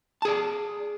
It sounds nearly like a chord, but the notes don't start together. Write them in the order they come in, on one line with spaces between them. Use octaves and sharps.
A5 G#4 D5